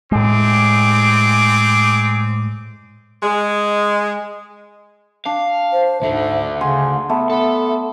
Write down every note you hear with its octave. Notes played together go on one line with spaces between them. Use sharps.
A2 G#3 C4 G#4 D6
G#3
D4 F5
C5
D2 G#2 D3 E5
C#3 F#5 G#5 C6
A3 B3 F#5
B3 A4 E5